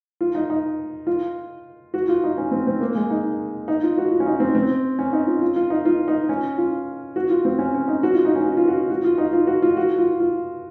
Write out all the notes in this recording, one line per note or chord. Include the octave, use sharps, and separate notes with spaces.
F4
D#4
D#4
F4
F#4
F4
D#4
C#4
C4
C4
A#3
G#3
D#4
D#4
F4
F#4
F4
C#4
D#4
C4
C4
C#4
D#4
F4
F4
F4
D#4
F4
D#4
C#4
F4
F#4
F4
C4
C#4
C#4
D#4
F#4
F4
D#4
C#4
F#4
F4
F#4
F#4
F4
D#4
F4
F#4
F4
F#4
F4
F4